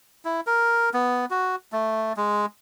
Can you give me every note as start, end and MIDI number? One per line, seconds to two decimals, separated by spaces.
0.25 0.41 64
0.47 0.90 70
0.94 1.25 59
1.30 1.56 66
1.72 2.13 57
2.17 2.46 56